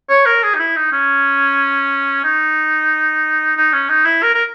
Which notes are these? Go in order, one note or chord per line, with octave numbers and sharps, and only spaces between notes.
C#5
A#4
G#4
D#4
E4
D#4
C#4
D#4
D#4
C#4
D#4
E4
A#4
A#4